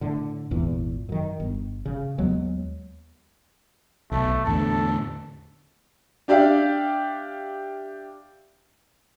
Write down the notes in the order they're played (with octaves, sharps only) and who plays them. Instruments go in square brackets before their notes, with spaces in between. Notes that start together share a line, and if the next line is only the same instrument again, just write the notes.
[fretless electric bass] A2 D3
G#1 E2 A#2
F#2 D#3
G1
C#3
D#2 F#3 G#3 B3
[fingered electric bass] B1 [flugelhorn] A3
[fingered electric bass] E2 A2 D3 [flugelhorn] A4
[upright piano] D4 G4 D5 E5 F5